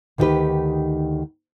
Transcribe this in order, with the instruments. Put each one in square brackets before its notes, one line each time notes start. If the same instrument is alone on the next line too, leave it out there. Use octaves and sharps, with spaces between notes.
[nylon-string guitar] D2 D#3 D#4 F4 G4 B4